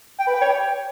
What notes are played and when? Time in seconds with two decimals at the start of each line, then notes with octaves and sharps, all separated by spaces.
0.19 G5
0.27 B4
0.34 G5
0.41 C#5
0.49 G5